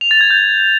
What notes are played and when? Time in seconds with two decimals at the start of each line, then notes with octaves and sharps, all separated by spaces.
0.01 F7
0.11 A6
0.21 G#6
0.30 G6